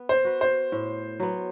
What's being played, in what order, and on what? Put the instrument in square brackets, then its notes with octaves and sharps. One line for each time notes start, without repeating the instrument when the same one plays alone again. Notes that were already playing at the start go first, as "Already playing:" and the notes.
Already playing: [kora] B3
[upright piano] C5
[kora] F#4 B4
[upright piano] C5
[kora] A2
F#3 B3